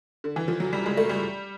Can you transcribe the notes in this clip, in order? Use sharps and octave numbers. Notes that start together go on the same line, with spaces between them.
D3
E3
F3
F#3
G3
G#3
A3
G3